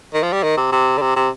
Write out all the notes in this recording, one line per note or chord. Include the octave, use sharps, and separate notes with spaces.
D#3
F3
G3
D#3
C3
C3
D3
C3
C3